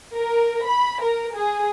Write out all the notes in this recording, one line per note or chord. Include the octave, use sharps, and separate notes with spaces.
A#4
B5
A#4
G#4